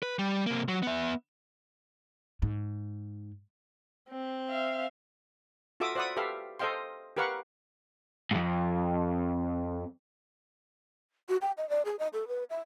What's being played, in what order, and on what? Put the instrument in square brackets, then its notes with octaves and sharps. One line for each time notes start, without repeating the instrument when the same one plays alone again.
[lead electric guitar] B4
G3
C3 A#3
F#3
B3 E5
[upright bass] G#2
[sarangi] C4
[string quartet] E5 F5
[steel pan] F4 F#4 A4 E5 D6 D#6
C5 D5 E5 F#5 B5 D#6
G4 A4 B4 E5 F5
A4 C5 D#5 F5 G5 C6
G4 A#4 B4 F5 F#5 C#6
[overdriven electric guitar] F2 G#2
[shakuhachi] F#4
G5
D#5
D5
G#4
D#5
A4
B4
E5